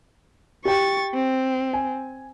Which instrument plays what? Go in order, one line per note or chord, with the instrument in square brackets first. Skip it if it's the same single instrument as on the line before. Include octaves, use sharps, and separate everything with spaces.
[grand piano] G4 G5 [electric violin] C#6 A6
[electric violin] C4
[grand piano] G#5